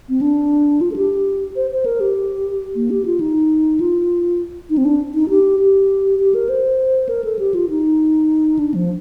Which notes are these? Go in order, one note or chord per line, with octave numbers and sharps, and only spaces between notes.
C4
D4
F4
A4
G4
C5
C5
A#4
G4
A#3
G4
F4
D#4
F4
D#4
C4
D4
D#4
G4
G4
G4
A#4
C5
A#4
A4
G4
F4
D#4
D4
F3